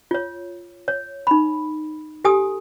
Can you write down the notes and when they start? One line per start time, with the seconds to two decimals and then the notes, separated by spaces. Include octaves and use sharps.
0.11 F4 C#5
0.88 C#5
1.27 D#4 B5
2.25 G4 A4 G#5 D#6